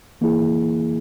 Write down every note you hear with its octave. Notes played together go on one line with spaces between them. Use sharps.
E3 A#3 E4 G#4